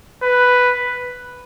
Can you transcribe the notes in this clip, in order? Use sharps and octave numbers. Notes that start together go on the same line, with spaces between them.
B4